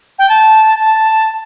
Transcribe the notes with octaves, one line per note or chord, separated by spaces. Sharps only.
G5
A5
A5